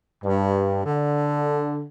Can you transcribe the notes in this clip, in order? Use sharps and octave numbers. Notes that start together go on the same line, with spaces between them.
G2
D3